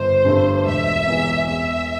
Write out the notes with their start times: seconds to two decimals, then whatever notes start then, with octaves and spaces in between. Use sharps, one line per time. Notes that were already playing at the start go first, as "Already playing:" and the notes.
Already playing: G1 C5
0.25 G2 D3 A3
0.65 E1 E5
1.07 E2 E3
1.47 E2 E5